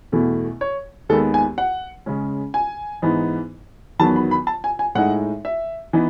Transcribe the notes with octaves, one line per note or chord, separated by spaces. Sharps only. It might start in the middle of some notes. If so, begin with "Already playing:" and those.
E2 B2 A3 E4
C#5
D#2 D#3 G#3 B3 A4
G#5
F#5
C#3 G#3 C#4
G#5
G#2 E3 B3 D#4
E2 D#3 F#3 B3 A5
B5
B5
A5
G#5
G#5
A2 G#3 D#4 F#5
E5
E3 B3 D#4